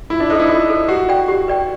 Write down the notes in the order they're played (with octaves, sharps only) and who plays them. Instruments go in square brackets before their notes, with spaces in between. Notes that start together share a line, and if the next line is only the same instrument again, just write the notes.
[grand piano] E4 [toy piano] F4
[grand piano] D4
[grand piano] D#4 [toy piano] A4 C5
[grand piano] E4
[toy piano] F4
A4 C5
[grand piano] F#4 [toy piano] G4
[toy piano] B4 D5 G5
G4
B4 D5 G5